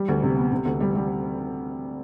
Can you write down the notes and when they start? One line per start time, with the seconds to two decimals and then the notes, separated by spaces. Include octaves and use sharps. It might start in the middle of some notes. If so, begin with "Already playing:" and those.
Already playing: G3
0.08 D2
0.23 C3
0.37 B3
0.52 C3
0.66 D2
0.80 G3
0.96 G3